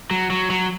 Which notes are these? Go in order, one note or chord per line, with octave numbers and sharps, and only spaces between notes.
F#3
F#3
F#3